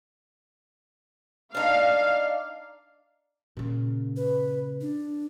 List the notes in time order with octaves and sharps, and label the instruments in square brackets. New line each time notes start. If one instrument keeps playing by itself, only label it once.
[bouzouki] D4 D#4 [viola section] F5
[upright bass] A#2 C#3
[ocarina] B4
D4